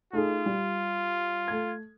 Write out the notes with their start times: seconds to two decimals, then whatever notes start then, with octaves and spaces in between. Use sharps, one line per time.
0.13 A3 D#4 F4 G#4
0.46 G3
1.48 A3 G#6